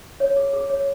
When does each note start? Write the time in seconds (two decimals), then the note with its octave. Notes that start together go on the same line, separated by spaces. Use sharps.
0.20 C#5
0.36 G#4
0.53 G#4
0.70 C#5